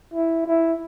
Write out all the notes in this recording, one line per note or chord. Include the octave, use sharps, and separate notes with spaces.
E4
E4